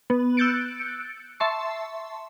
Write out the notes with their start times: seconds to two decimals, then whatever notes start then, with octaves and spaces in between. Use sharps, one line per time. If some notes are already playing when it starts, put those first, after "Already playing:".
0.10 B3
0.37 E6 F#6 G6 A6 C#7 D7
1.40 E5 A5 C6 C#6